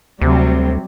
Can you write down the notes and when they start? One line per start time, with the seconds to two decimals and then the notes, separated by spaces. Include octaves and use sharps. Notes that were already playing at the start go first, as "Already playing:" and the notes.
0.21 D2 C3 F#3 G3